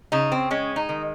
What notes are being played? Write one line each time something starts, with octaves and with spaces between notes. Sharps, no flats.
C#3 D#4
C4
G#3 C#4
D#4
D#3